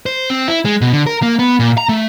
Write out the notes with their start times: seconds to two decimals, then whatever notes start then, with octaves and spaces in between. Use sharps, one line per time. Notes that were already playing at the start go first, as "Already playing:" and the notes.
0.06 C5
0.30 C4
0.48 E4
0.65 G#3
0.81 B2
0.93 D3
1.07 A#4
1.22 A#3
1.39 B3
1.60 A#2
1.78 A#5
1.89 A3